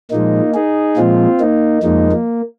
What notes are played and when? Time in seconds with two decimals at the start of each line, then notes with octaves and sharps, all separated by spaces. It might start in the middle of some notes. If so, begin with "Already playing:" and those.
0.11 A#2 F3 G#3 A#3 D#4
0.54 D#4 G#4
0.97 A#2 F3 G#3 C4 F4
1.40 A#3 D#4
1.83 F2 F3 G#3 A#3 D#4
2.12 A#3